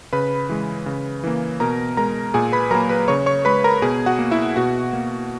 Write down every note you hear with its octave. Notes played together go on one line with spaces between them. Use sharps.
C#3 B4 B5
E3 G#3
C#3
E3 A#3
B2 A#4 A#5
G#3 A#4 A#5
A#2 G#4 G#5
B4 B5
F#3 A#3 A#4 A#5
B4 B5
C#3 C#5 C#6
C#5 C#6
G#3 B4 B5
A#4 A#5
B2 G#4 G#5
F#4 F#5
A#3
E4 E5
B2 F#4 F#5
A#3